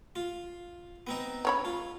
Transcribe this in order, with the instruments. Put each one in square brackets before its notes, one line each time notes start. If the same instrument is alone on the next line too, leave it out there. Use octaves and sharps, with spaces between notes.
[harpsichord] F4
B3 C4 D#4
[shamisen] C#3 C#5 B5
[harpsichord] F4